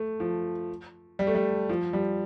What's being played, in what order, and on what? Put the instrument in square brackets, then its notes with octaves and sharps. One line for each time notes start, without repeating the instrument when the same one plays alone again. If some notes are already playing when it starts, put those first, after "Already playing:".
Already playing: [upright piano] A3
F3
G3
A3
G3
F3
G3